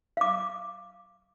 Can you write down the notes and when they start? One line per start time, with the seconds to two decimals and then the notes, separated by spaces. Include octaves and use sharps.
0.17 F5 D6